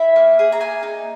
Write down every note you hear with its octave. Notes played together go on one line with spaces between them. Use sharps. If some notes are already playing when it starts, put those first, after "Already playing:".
Already playing: E4 E5
A#3
G#4
A#5
A#3 G#5
D#4